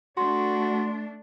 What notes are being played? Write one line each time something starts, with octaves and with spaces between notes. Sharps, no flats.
A3 D4 F#4 C6